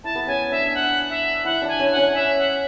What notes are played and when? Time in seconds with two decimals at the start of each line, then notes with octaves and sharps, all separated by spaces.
0.04 E4 A5
0.15 B3
0.27 C#4 G#5
0.51 D4 E5
0.75 F#5
1.10 E5
1.44 E4 F#5
1.62 D4
1.68 G#5
1.80 C#4
1.92 C#4 F#5
2.15 E5
2.38 F#5